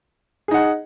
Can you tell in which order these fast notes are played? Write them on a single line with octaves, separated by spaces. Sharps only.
G#4 D#4 F#5